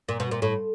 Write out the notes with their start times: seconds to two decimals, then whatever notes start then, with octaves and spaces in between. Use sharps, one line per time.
0.09 A#2
0.20 B2
0.31 A#2
0.42 A2